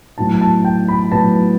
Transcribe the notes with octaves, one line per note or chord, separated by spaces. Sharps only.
A2 F#3 B3 A5
A5
G5
B5
A2 F#3 B3 A5